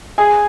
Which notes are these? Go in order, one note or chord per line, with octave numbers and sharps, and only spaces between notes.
G#4 G#5